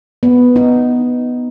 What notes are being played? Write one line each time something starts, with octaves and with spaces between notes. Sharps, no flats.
B3
D#4